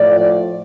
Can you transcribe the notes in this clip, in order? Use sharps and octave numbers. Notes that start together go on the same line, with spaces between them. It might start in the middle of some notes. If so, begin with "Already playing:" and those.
Already playing: A2 F3 A3 D5